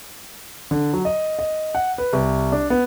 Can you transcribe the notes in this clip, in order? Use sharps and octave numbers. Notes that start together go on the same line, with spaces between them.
D3
F#3
D#5
D#5
F#5
B4
C2
D4
B3